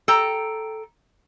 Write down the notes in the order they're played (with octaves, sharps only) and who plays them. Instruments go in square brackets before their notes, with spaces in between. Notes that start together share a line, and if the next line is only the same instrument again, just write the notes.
[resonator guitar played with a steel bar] A4 G5 A#5